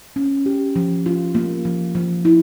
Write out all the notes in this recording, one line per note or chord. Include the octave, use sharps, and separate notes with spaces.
C#4
G4
F3
F4
A#3
F3
F3
E4